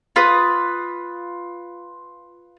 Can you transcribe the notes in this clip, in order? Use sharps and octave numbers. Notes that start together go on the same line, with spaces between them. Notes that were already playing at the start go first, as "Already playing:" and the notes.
F4 B4 D#6